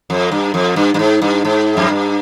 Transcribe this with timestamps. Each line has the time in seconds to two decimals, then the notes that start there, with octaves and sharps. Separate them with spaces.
0.10 F2
0.32 G2
0.54 F2
0.76 G2
0.94 G2
0.99 G#2
1.22 G2
1.45 G#2
1.77 F2
1.89 G2